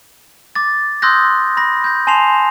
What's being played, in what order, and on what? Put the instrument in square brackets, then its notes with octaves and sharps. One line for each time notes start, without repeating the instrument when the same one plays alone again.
[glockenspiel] D6 A6
C6 D#6 E6 F#6 G6 A#6
B5 A#6
G6 A#6
G#5 A5 C6 C7 F7